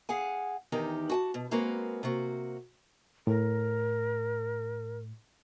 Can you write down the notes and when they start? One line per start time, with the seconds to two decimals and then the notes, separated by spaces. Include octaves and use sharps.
0.09 G#4 F5 F#5 G#5
0.72 E2 D#3 D#4 G4 A#4
1.10 F#4 G#5 A5
1.34 B2
1.51 G#3 A#3 C4 F#4 A#4 B4
2.03 C3 A#3 F#4
3.27 A2 A#4